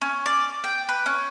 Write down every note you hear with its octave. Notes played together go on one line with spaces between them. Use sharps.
C#4
D5
G5
B4
C#4